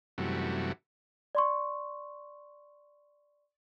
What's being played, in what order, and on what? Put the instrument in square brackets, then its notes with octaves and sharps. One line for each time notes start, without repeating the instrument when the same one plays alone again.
[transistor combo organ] F#2 C3 E3 G3 A3 F#4
[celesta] D5 C6 C#6